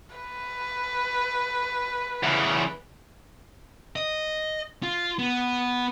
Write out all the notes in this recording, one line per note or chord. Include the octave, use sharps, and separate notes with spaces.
B4
E2 C#3
D#5
F4
B3